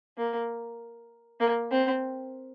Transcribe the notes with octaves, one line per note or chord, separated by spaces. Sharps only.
A#3
A#3
C4